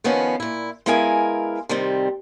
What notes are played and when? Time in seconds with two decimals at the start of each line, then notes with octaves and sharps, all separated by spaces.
0.04 D#3 F3 B3 C#4
0.40 A#2 E4
0.86 G#3 B3 E4 A#4 F5 G#5
1.69 C3 D#3 G3 C4